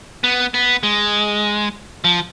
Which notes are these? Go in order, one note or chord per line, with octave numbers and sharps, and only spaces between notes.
B3
B3
G#3
F3